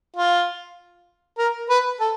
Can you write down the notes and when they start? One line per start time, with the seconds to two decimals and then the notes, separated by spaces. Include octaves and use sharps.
0.17 F4
1.38 A#4
1.69 B4
2.00 A4